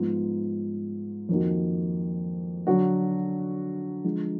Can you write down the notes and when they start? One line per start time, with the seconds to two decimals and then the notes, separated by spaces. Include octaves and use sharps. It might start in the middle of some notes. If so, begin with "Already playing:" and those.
Already playing: G#2 F3 B3 F4
1.29 F2 D#3 A#3 D#4 F#4
2.67 D3 F#3 D4 F#4
4.04 D3 F3 G#3